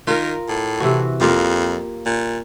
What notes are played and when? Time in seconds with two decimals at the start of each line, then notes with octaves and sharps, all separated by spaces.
0.07 D#3 F4 A#4
0.48 A2
0.80 C3 E3 F#4
1.21 F2 A#3 F4 G4
2.06 A#2